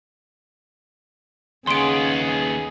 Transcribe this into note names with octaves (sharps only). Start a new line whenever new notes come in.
D#2 C#3 B3 G#4 C6 D7